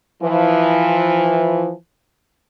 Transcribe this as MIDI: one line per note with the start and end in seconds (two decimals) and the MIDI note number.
0.21 1.71 52
0.21 1.71 53